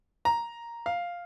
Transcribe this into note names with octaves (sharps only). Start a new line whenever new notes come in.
A#5
F5